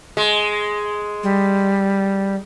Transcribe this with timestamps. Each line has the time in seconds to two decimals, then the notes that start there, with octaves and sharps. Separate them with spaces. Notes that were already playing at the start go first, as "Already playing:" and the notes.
0.17 G#3
1.23 G3